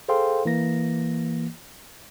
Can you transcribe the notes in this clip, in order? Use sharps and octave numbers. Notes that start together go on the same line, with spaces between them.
G#4 A4 C5 F5 G5 C6
E3 A#3 A#6